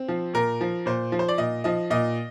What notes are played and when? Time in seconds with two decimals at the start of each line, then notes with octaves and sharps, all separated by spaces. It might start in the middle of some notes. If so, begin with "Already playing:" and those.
Already playing: C4
0.08 F3
0.33 A#2 A#4
0.61 F3
0.86 A#2 C5
1.12 F3
1.19 C5
1.28 D5
1.38 A#2 D#5
1.64 F3 D#5
1.90 A#2 D#5